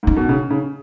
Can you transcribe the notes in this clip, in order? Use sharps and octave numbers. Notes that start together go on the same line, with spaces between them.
G#2 C#4
B2
C#3
C#3